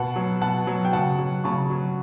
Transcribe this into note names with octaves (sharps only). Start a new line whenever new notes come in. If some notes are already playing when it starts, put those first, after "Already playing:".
Already playing: B2 F#5 A5
F#3
B2 F#5 A5
F#3
G5
C#3 F#5 A5
F#3
C#3 A5 C#6
F#3